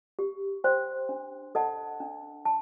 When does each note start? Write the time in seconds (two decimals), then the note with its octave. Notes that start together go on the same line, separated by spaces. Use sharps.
0.19 G4
0.64 C5 G5 C6
1.09 D4
1.55 A4 D#5 F#5 A5
2.00 D4
2.45 A5